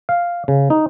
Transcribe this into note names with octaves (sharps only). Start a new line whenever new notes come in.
F5
C#3
D#4